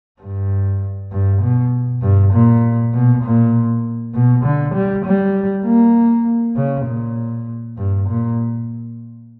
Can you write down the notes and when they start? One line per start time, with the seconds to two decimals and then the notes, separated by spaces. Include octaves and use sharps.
0.21 G2
1.12 G2
1.42 B2
2.02 G2
2.33 A#2
2.94 B2
3.23 A#2
4.14 B2
4.45 D3
4.75 G3
5.05 G3
5.65 A#3
6.57 C#3
6.86 A#2
7.78 G2
8.08 A#2